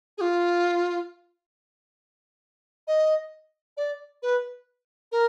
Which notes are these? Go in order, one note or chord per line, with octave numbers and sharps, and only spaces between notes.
G#4
F4
D#5
D5
B4
A#4